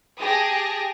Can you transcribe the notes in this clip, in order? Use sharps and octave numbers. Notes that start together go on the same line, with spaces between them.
G4 G#4 G#5 A5 D#6 A#6